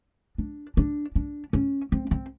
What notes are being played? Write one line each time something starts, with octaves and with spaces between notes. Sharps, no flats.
D4
D4
D4
C#4
C4
C4